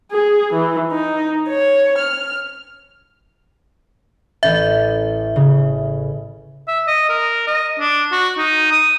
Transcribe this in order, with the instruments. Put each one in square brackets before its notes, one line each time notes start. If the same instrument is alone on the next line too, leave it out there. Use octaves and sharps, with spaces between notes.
[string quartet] G#4
E3
D#4
C#5
F6
[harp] A1 C#4 G6 [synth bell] E5
[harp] C#3
[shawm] E5
D#5
A#4
D#5
D4
F#4
D#4
D#6